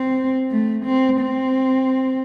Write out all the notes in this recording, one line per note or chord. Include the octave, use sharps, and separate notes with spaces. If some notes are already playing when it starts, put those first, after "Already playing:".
Already playing: C4
A3
C4
C4